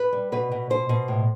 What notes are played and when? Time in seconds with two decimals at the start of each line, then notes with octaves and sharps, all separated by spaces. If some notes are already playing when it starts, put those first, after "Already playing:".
Already playing: B4
0.13 G3
0.32 B2 B4
0.52 B2
0.70 B2 C5
0.89 B2
1.08 A2